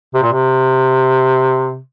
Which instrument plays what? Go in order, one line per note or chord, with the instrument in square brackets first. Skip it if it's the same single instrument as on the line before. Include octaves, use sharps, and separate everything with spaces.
[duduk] C3
A#2
C3